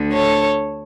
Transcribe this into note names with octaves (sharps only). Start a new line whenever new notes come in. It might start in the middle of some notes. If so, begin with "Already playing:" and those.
Already playing: D2 D3
A4 C#5